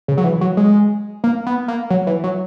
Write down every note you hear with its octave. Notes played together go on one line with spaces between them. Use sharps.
C#3
F#3
E3
F#3
G#3
A#3
B3
A#3
F#3
E3
F#3